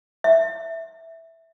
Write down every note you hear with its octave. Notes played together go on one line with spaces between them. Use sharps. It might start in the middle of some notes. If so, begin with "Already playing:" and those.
E5